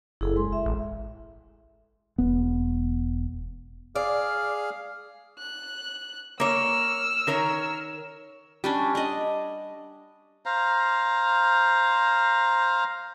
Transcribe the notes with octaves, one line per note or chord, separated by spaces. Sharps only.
F#1 E4 G#4 A4
G#3 C6
E5
A1
E1 B3
G#4 D5 F5 F6
F#6
A#3 C#5 E6 F6
D#3 A#4 C#5
G3 C#4 D4
D4 D#5
C5 F5 A#5